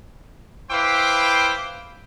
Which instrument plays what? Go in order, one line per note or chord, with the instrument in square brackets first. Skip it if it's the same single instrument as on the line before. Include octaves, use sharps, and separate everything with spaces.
[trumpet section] E4 B4 C5 F5 G5 D6